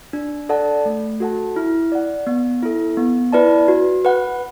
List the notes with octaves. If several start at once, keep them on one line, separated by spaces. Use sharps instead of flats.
D4
A4 D5 F#5 A5
A3
F#4 A4 F#5 A5
E4
D5 F#5
B3
E4 A4
B3
E4 B4 D5 A5
F#4
B4 F#5